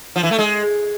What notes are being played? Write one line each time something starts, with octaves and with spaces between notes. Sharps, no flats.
F3
E3
A3
G#3